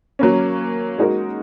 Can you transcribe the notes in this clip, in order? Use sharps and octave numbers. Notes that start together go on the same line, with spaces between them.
F#3 A#3 C#4
G#3 D#4 F#4 A#4